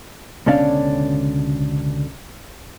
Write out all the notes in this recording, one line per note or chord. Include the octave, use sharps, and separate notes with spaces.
C#2 B2 D3 C#4 D4 F5